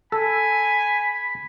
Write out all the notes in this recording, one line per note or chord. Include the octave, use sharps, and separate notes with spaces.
A4 G#5 B5